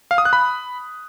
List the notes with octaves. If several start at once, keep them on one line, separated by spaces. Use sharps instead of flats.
F5
D#6
F#6
B5